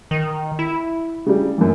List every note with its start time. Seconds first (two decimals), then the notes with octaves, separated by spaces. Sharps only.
0.11 D#3
0.59 E4
1.26 C#3 G3
1.58 F#2 E3